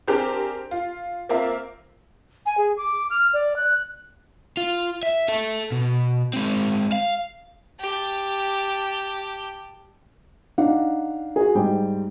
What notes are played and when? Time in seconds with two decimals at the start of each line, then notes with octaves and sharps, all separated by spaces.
0.07 C4 D4 G4 G#4 A#4
0.71 F4
1.29 A#3 C4 F4 A#4 E5
2.46 G#5
2.58 G#4
2.77 D6
3.10 F6
3.34 D5
3.56 F#6
4.57 F4
5.03 E5
5.28 A4 E5
5.72 B2
6.33 G#3 C4
6.92 F5
7.80 G4 A5
10.58 D4 D#4 F5 F#5
11.36 F#4 G#4
11.55 G#2 G3 G5